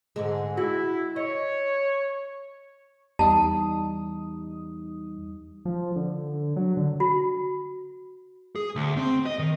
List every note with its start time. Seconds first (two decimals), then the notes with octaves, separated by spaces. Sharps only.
0.16 G#2 D3 G#3
0.57 E4 F#4
1.16 C#5 D#5
3.19 E2 G3 D#4 A5 D#6
5.65 F3
5.96 D3
6.56 F#3
6.77 D3
7.00 F#4
8.55 G#4
8.76 D2
8.97 C4
9.26 D#5
9.39 D#3